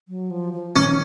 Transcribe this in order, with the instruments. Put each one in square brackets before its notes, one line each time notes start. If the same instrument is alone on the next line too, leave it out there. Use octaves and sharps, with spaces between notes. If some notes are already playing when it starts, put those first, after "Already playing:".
[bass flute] F#3
F3
F3
[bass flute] D#3 [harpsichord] C#4